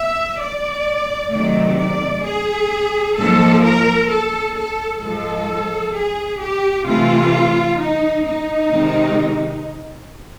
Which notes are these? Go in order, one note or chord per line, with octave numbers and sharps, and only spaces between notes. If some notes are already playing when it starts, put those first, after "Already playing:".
Already playing: E5
D5
C3 D#3 F#3 A3 D5
D5
G#4
G#2 F3 A#3 A4
A#4
A4
A4
G#2 F3 G#3 A4
G#4
G4
C3 E3 A3 F4
D#4
D#4
C3 D#3 G#3